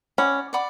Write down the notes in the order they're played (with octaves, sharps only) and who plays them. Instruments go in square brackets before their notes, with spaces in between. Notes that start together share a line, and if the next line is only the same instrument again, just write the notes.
[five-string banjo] C#4 [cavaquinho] D5 F#5 B5 D6
[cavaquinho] D5 F#5 B5 D6